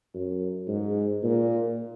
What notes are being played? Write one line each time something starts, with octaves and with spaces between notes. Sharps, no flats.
F#2
G#2
A#2